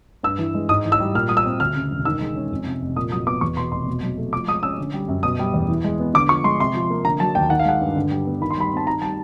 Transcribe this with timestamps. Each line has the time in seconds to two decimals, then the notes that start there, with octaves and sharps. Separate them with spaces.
0.23 G2 E6
0.38 E3
0.55 G#3
0.69 G#2 D#6
0.85 E3
0.92 E6
1.00 G3
1.15 A#2 F6
1.29 G3 D#6
1.37 E6
1.45 C4
1.60 D2 F6
1.75 C#3
1.91 E1
2.05 D#3 E6
2.21 G#3
2.35 C#4
2.51 F2
2.66 C3
2.82 F1
2.96 A#2 D#6
3.12 F#3 D#6
3.27 B3 D6
3.41 E2 C#6
3.57 B2 C6
3.72 F1 C6
3.87 B2
4.03 F#3
4.18 A3
4.33 F3 D6
4.48 G#3 D#6
4.63 C#4 E6
4.79 D3
4.93 G3
5.08 F#2
5.23 B2 D#6
5.39 G3
5.54 E2
5.68 E3
5.84 G#3
6.00 B3
6.14 D3 D6
6.29 F3 C#6
6.44 G#3 C6
6.60 C3 C6
6.74 F3
6.90 A#3
7.05 D3 A#5
7.20 F#3 A5
7.35 D#2 G5
7.50 D#3 F#5
7.59 F5
7.66 G#3 F#5
7.81 G2
7.96 D3
8.11 G3
8.27 B3
8.41 D#3 B5
8.51 C6
8.57 G3 B5
8.72 C4 A5
8.87 D#3 A#5
9.02 G3 A5